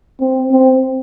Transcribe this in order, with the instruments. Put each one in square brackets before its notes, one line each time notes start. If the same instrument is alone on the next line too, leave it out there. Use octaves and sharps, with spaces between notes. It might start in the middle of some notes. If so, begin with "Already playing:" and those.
[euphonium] C4
C4